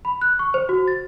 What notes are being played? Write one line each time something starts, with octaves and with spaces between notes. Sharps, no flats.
B5
F#6
C#6
C5
F#4
A6